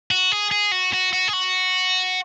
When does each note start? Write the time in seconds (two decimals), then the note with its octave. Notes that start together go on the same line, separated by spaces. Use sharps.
0.11 F#4
0.32 G#4
0.51 G#4
0.72 F#4
0.93 F#4
1.13 F#4
1.28 G#4
1.33 F#4